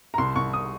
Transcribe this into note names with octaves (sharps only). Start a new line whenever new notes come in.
A#5
C2 C6
C2 C#6
D#6